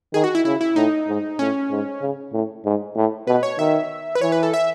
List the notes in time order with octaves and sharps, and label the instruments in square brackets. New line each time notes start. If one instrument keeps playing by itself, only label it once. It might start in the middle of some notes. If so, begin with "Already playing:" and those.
[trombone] D#3 [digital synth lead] G#4
[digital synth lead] F#4
E4
[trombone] C#3 [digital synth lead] E4
[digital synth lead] E4
[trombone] A2 [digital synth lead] D#4
[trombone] G#2
[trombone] A2 [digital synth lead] C#4
[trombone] G#2
C#3
A2
G#2
A2
[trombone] B2 [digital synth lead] B4
[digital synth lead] C#5
[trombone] D#3 [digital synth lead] E5
[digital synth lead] B4
[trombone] E3 [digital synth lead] C#5
[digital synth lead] B4
A4
E5